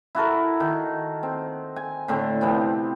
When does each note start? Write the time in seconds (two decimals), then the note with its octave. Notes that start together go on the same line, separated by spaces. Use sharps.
0.15 E4 F#4 A4 A#4
0.60 D#3
1.23 C4
1.76 G#5
2.08 A2 D3 C4
2.41 C3 F3 B3 C4